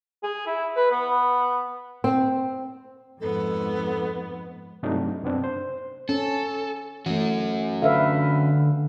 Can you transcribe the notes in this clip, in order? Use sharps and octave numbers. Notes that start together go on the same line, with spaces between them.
G#4
E4
B4
B3
C4
F2 G#2 B3 A4
G2 C3 F#3 A3 D4 D#4
F#2 C3 B3 C4 D4
C5
C#4 A4
E3 A3 C#4 F#4
D3 B4 E5 F5